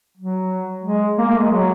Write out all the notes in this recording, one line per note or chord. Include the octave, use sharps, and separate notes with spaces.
F#3
G#3
A#3
A#3
G#3
F#3